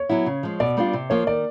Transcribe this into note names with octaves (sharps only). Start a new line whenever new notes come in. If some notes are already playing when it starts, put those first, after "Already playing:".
Already playing: C#5
F#3 B3 E4
C#3
F3 G#3
B2 D5
G3 B3 D4 F4
C3
F3 A#3 C#5
D#3 D5